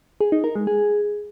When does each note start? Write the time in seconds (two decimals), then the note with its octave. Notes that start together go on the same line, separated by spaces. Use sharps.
0.21 G#4
0.32 D#4
0.44 A#4
0.55 G#3
0.67 G#4